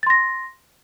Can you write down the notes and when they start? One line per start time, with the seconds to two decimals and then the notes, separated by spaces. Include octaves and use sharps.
0.03 A6
0.07 C6
0.10 A#6